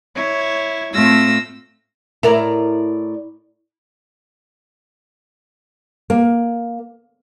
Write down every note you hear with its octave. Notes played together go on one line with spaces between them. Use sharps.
E4 C#5
A2 A3 C4 F4 E6 A#6
A2 E4 A#4 D5 A#5
A#3